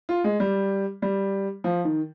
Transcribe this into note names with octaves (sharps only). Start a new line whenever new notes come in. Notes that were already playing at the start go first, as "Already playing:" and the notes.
F4
G#3
G3
G3
F3
D#3